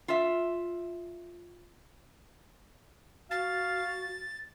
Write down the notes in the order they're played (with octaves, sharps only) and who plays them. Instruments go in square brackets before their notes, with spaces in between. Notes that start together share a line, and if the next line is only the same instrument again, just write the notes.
[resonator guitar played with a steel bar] F4 E5
[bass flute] F#4 [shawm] F5 [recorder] A6